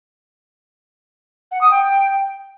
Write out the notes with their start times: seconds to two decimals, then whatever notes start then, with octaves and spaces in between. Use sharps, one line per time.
1.51 F#5
1.61 D#6
1.71 G5